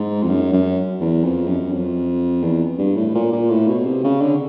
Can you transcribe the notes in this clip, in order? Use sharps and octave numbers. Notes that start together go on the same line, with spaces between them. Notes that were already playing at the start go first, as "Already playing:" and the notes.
Already playing: G#2
F2
F#2
F#2
E2
F2
F#2
F2
E2
G2
A2
A#2
A#2
A2
B2
C3
C#3
D3